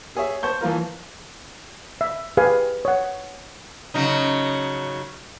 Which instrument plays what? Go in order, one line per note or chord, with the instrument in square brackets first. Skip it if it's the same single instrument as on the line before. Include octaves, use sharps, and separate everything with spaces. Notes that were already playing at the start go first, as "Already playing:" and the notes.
[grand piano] G4 G#4 C#5 E5
C5 A5 C#6 G6
E3 F3 A#3 F4 A#4
[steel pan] E5
G4 G#4 B4 F5 G#5
C#5 F#5
[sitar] C#3 F#3 D#4